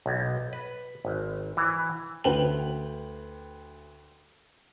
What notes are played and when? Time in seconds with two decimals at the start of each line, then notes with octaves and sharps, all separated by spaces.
0.06 B1
0.53 B4
1.05 G#1
1.57 E3
2.24 D2 B4 F#5 G5 F#7